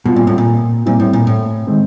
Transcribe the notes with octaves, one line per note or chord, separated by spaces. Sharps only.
B2 G3 C4 F4
A#2
A2
A#2
A#2 G3 C4 E4
A2
A#2
A2
D#3 G#3 C4